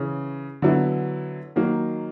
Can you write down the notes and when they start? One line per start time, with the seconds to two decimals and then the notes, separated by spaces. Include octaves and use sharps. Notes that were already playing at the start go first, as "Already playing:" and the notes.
Already playing: C#3 E3
0.62 D3 F#3 B3 E4
1.56 D#3 F#3 A#3